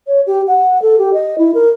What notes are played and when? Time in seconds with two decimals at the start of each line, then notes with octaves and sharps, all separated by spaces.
0.07 C#5
0.27 G4
0.47 F#5
0.82 A4
0.99 G4
1.13 D#5
1.38 E4
1.54 A#4